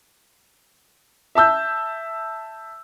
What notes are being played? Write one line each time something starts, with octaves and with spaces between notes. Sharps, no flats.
E5 A5 E6 G6